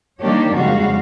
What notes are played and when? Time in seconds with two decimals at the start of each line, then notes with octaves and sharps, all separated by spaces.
0.20 D#3 G3 A#3 D4 G4 C#5
0.56 F2 C#3 G3 G#3 F#4 F5